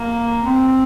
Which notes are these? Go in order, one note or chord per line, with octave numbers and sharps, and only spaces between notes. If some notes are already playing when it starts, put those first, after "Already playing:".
Already playing: A#3
C4